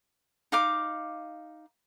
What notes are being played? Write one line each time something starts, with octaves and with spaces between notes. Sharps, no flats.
D#4 F5 D6